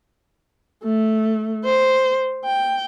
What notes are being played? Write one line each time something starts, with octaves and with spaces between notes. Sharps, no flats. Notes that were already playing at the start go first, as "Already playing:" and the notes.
A3
C5
G5